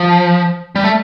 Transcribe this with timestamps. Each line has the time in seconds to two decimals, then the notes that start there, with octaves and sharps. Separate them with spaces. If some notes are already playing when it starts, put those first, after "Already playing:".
Already playing: F3
0.76 G3
0.84 A3